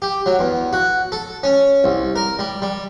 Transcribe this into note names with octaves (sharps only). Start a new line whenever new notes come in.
G4
F#3
E2
F#4
A4
C#4
C2
A#4
G3
G3